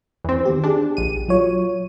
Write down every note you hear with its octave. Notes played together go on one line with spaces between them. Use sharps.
E2 C4
D#3 B3 G4
D4 G4 G#4
A#1 D#7
F#3 F4 C#5